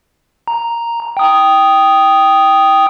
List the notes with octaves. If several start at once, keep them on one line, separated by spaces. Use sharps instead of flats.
A#5
G5 D#6